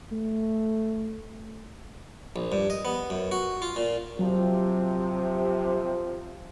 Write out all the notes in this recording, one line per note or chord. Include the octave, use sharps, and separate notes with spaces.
A3
A#1
G2
D#5
B3
F#2
F#4
F4
A#2
C3 F3 F#3